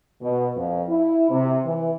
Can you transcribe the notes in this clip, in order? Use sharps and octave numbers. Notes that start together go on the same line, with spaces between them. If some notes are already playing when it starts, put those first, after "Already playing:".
B2
F2
E4
C3
E3